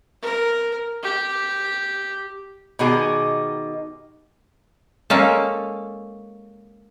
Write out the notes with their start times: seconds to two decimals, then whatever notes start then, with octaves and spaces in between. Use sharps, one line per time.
0.23 A#4
1.03 G4
2.79 B2 D#3 D#4 G4 G#4
5.10 G#3 A#3 C#4 A4